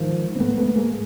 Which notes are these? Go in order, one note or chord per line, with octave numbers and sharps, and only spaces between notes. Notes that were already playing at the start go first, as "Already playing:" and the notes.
Already playing: G#2 D#3 F3
C4
G#2 A3 B3
A3 B3
G#3 A#3